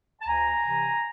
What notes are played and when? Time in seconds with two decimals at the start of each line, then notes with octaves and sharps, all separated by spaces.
0.21 A5
0.27 D2 G#5 A#5
0.61 C3 E3